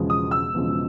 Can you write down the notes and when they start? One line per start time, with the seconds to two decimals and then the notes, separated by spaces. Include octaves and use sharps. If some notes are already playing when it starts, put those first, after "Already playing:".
Already playing: E1 E2 C#3 F3 G#3
0.10 D#6
0.31 E6
0.54 E1 E2 C#3 F3 G#3